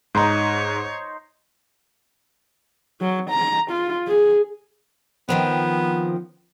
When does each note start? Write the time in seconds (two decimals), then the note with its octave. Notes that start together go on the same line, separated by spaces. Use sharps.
0.15 G#2 D#4 C5 C#5 D#5 A#5 C6
3.01 F#3
3.30 A#5
3.71 F4
4.08 G#4
5.29 D#3 F3 B3 C4